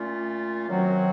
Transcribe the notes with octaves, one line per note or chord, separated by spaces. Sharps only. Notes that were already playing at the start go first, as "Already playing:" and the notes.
Already playing: A#2 A3 C#4 F4
F#2 D#3 F#3 C4 F#4